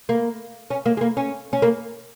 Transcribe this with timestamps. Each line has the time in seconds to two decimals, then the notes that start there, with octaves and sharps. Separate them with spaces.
0.09 A#3
0.70 C#4
0.86 A#3
0.97 G#3
1.01 A#3
1.17 C#4
1.53 C#4
1.62 A#3